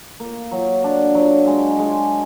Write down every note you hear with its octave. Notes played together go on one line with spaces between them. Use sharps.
A#3
F#3
D4
F#3
G#3
G#3